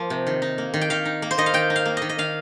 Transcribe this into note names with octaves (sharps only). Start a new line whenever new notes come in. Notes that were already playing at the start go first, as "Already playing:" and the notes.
Already playing: F3 A#3
C3
D#3
D#4
A#3
D#3
G5
D#3 F5
D#4
A#3
C5
D#3 D#5
F5
D#3 G5
D#4
F5
A#3
D#3 D#5
D#5
D#3 F5